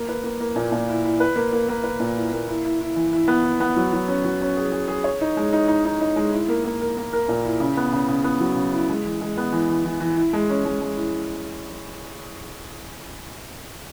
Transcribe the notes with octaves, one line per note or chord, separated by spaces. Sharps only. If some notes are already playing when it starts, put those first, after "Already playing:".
Already playing: A#3
B4
A#3
A#3
A#2
A#2
E4
E4
B4
A#3
A#3
A#3
B4
A#2
E4
A#3
E4
E4
E4
E3
E4
B3
E4
B3
F#3
F#3
C#4
F#3
C#4
G#4
G#4
G#4
C#5
D#4
G#3
D#4
D#4
D#4
D#4
G#3
E4
A#3
A#3
A#4
A#3
A#4
A#2
E4
C#3
B3
C#3
C#3
B3
F#3
C#3
E4
G#3
E3
G#3
B3
E3
E3
E3
E3
E4
G#3
C#4
G#3
G#3
E4